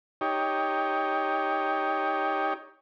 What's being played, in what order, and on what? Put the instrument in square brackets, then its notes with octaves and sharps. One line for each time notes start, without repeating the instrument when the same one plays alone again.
[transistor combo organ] D#4 G4 C#5